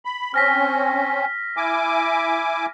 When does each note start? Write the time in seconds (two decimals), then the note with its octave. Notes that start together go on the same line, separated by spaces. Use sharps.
0.05 B5
0.34 C4 C#4 F6 A#6 B6
1.57 E4 G#5 D6